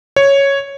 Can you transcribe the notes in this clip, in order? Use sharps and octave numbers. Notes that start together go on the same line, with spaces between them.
C#5